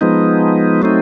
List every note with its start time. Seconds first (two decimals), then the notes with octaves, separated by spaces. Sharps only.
0.01 F3 G#3 B3 D#4
0.82 F#3 A3 C4 D#4